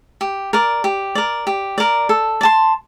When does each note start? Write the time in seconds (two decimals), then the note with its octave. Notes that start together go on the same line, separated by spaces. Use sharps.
0.21 G4
0.53 A#4 D5
0.84 G4
1.15 A#4 D5
1.47 G4
1.78 A#4 D5
2.09 A4
2.41 D5
2.43 A5 C6